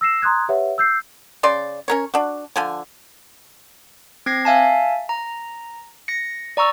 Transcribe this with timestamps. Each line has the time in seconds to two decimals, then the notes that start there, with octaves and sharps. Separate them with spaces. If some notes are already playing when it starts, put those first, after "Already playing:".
0.01 E6 A#6 C7 E7
0.22 A#5 C6 D#6 F#6 G#6
0.49 G4 B4 C#5 E5 F#5
0.78 E6 G6 C7
1.43 C#3 D5 C6
1.88 C#4 A#4 C#5
2.14 D4 F#4
2.56 D3 F3 G#5
4.26 C4 G#6 A#6 C7
4.45 E5 F5 G#5 A5
5.09 A#5
6.08 A#6 C#7
6.57 D5 A#5 C#6 E6